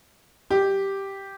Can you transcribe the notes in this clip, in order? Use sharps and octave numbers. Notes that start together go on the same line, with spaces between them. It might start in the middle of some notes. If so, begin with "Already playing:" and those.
G4